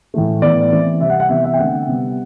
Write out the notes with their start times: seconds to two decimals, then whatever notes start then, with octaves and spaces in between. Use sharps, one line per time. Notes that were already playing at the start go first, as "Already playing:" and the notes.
0.14 A2 E3 A3
0.42 A2 E3 B3 D5
0.72 E3 A3 C4
1.00 C3 G3 C4 E5
1.10 F#5
1.20 F#5
1.29 C3 E3 B3 E5
1.44 E5
1.53 G5
1.59 D3 A3 C4 F#5
1.87 C3 G3 B3